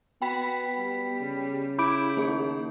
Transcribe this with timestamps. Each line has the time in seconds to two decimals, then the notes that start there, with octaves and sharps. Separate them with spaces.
0.22 B3 F#4 G5 B5 B6
0.78 G3
1.22 C#3
1.79 E4 B5 D6 G6 D7
2.17 D#3 A#3 G#4